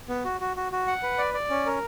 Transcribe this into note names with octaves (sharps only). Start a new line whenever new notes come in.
B3
F#4
F#4
F#4
F#4
F#5
B4
D5
D5
C#4
A#4